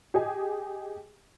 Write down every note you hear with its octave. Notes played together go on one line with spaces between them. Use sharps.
G4 G#4 D#5 G#5